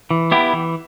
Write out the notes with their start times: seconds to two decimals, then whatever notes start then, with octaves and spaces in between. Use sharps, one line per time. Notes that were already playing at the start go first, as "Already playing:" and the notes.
0.11 E3
0.31 B3 E4 G4
0.53 E3